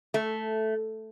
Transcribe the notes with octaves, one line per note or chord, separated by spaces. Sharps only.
A3